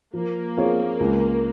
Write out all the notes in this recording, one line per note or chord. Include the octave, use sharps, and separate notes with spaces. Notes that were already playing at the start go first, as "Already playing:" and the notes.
F3 A#3
C4 F4 G#4 C#5
C#2